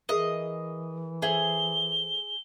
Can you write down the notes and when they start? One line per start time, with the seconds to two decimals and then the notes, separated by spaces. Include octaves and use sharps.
0.09 E3 G#4 A#4 D#5 E5
1.22 G#4 A4 C5 E5 G7